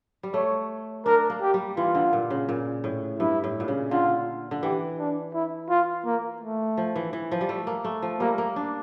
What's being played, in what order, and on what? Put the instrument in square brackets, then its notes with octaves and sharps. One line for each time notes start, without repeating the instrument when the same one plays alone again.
[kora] G3
[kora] A3 [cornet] C#5
[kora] D4 [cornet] A#4
[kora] A#3
[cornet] G4
[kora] G3
[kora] E3 [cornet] F4
[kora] D3
A#2
C#3
A#2
A2
[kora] G2 [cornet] E4
[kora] A2
A#2
C#3
[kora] D3 [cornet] F4
[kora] D3
[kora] E3 [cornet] G4
[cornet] D4
E4
F4
A#3
A3
[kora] F3
E3
E3
F3
G3
A3
A#3
A3
F3
[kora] G3 [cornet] A#3
[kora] A#3
D4